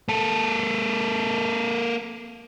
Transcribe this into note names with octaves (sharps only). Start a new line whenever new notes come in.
A#3 A4